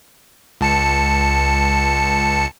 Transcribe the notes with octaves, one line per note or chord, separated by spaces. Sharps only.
C#2 A5 C#7